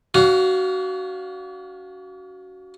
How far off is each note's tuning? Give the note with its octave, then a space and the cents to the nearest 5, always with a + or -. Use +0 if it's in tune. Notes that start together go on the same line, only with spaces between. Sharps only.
C#4 +45 F#4 +15 F5 +0